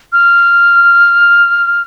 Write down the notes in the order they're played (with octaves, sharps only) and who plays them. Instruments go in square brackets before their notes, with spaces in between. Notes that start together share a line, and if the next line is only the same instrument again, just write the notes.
[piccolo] F6